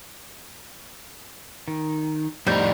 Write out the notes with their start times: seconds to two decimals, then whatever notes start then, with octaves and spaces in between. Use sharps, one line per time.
1.68 D#3
2.47 F2 A2 D#3 G3 D#4 C5 G6